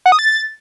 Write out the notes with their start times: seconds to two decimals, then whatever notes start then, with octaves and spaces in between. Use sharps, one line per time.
0.06 F#5
0.12 D#6
0.19 A6